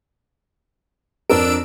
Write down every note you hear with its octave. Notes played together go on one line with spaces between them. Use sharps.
F2 D4 A#4 E6 D7